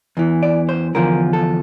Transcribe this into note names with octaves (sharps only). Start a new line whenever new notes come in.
E2 E3
D5
C5
E2 D3 F3 A#4
A4